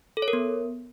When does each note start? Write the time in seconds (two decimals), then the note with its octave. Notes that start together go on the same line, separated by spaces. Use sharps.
0.17 A4
0.22 C#5
0.28 A#4
0.33 B3